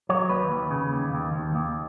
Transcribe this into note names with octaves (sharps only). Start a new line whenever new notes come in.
F#3 C#5
D#2 B4
D#2
C#3
D#2
D#2
D#2
D#2